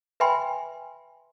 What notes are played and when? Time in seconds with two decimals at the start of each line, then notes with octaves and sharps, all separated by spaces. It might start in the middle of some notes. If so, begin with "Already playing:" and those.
0.20 B4 E5 G5 G#5 B5 C6